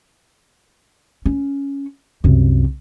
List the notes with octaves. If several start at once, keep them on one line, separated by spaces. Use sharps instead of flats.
C#4
C2 F#2